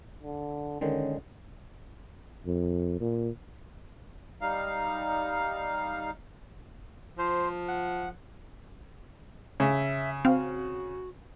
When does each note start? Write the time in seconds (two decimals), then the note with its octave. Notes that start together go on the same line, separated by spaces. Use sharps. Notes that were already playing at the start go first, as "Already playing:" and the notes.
0.23 D3
0.81 D3 D#3 G#3 C#4
2.46 F2
3.00 A#2
4.41 G3 D#4 F5
7.18 F3 C5
7.68 F#5
9.60 C#3 E5
10.25 C4 F#4 F5